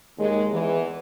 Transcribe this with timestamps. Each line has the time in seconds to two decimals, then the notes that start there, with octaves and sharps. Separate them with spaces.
0.18 D#2 G#3
0.51 E2 E3